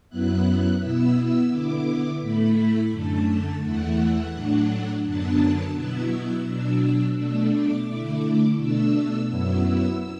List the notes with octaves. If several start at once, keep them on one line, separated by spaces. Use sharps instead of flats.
F#2 F#3 B3 E4 F#6
B2 B3 E4 E6
D3 B3 E4 D6
A2 A3 E4 B5
F#2 D3 A3 A5
E2 E3 A3 E4 F#5
A2 F#3 A3 D4
F#2 D3 F#3 B3 D4 A5
B2 F#3 B3 E4 E6
B2 F#3 D4
B2 A3 D4 E6
D6
D3 A3 E4
B2 A3 D4 E6
F#2 F#3 B3 E4 E6